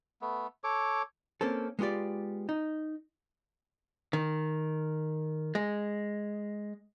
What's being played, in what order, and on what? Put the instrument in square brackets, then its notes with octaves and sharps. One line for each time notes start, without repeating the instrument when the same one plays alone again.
[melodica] A3 B3
A4 C#5 D6
[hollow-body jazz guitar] A#3 C4 C#4 A4
G#3 B3 F4 G4 D5
D#4
D#3
G#3